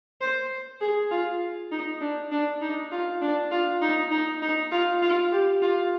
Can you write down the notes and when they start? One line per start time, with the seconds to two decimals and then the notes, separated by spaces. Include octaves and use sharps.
0.21 C5
0.81 G#4
1.11 F4
1.71 D#4
2.01 D4
2.31 D4
2.61 D#4
2.92 F4
3.21 D4
3.51 F4
3.82 D#4
4.11 D#4
4.42 D#4
4.71 F4
5.02 F4
5.31 G4
5.62 F4